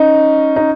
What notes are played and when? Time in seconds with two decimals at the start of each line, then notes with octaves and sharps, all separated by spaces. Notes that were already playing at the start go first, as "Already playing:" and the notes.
Already playing: C#4 D#4
0.56 D#4